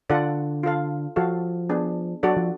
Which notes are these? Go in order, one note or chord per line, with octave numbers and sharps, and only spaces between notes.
D3 F4 A4 D5 F#5
F4 A4 F5
F3 F#4 A4 F5
B3 D4 G#4
F#3 D4 F#4 A4 D5 F#5
F3